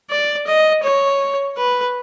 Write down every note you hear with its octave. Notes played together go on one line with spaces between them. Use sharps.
D5
D#5
C#5
B4